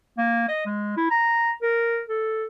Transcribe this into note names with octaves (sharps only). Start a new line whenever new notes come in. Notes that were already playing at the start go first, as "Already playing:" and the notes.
A#3
D#5
G#3
E4
A#5
A#4
A4